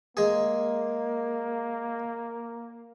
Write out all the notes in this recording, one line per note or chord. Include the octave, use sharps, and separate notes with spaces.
G#3 A#3 G#4